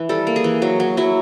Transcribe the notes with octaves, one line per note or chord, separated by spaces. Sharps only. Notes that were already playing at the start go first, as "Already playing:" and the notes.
Already playing: E3
G3 A4
A#3
G#4
E3
F#3
F#3
F#3 E4